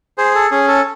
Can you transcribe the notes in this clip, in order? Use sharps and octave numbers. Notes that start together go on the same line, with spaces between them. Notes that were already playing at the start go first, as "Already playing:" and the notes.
G#4 C5
A4
C#4 G#4
A4